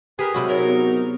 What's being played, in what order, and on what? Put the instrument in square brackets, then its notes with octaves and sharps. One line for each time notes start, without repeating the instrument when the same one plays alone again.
[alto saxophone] G4 [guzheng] G#4 [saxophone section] A#4 B4
[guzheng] C3 E4 F#4 [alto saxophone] F#3 [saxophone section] G#3
[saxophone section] D#4 A#4 [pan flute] C#5
[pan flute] B3